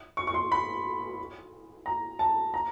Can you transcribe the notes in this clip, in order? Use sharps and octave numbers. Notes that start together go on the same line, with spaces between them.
C#6
C#6
C6
B5
A#5
A5
A#5